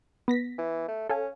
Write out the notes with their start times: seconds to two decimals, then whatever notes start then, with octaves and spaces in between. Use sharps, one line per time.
0.28 B3 A#6 B6
0.58 E3
0.88 A3
1.09 C#4 A4 F5 G#5